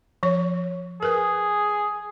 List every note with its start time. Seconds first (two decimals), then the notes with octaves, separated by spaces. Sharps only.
0.23 F3 C#5
1.03 G#4 A#4 B4